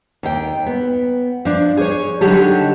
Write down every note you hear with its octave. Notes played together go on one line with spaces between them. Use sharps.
D#2 G5
B3
F3 D4
G#4 C#5
D3 F#3 D#4 G4 A4